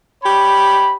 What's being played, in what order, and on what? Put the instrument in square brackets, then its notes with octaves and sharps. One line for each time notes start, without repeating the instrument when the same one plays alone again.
[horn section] G4 C#5 B5